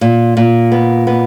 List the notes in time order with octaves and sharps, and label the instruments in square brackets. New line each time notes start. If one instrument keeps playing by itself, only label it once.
[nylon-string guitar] A#2
A#2
B3
B3